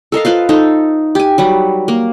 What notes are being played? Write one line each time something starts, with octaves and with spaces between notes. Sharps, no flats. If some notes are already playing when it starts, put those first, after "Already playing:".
A4 A#4 D#5 F5
F4 B4 C5 F5
D#4 A4 C5
G4 G#5
F#3 G3 B4
A#3